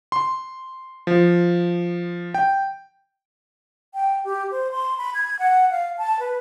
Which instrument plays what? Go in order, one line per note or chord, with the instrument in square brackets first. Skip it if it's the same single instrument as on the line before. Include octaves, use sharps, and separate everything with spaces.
[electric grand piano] C6
F3
G5
[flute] G5
G4
C5
C6
B5
G#6
F#5
F5
A5
B4